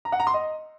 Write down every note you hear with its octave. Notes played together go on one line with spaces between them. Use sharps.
A#5
F#5
A#5
C6
D#5